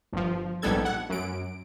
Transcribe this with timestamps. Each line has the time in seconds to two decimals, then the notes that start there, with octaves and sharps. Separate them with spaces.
0.13 G1 F3
0.62 A#1 G#2 G3 B3 A4 G#6
0.85 F#5
1.10 F#2 D7